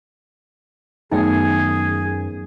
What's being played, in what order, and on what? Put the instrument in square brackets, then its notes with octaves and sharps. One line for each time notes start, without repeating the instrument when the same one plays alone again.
[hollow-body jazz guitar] F#2 [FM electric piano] D#3 A3 B3 [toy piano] D#4 E5 G5 [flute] G#4